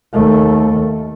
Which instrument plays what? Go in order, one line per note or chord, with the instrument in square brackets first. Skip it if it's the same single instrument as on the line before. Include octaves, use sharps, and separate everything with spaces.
[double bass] D#2 A3